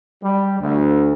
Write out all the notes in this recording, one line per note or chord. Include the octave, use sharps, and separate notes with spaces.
G3
D2